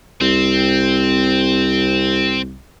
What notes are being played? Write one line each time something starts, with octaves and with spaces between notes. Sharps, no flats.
C2 C4